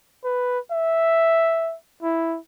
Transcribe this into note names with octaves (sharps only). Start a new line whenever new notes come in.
B4
E5
E4